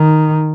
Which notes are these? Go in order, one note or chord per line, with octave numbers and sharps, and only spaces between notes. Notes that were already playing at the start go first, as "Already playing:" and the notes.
Already playing: D#3